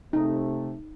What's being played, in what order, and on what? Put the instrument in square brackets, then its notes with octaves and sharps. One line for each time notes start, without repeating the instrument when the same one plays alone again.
[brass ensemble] C3 A3 [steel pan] D#4